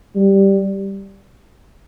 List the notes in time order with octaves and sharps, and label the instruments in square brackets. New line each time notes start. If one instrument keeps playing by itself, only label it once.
[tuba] G3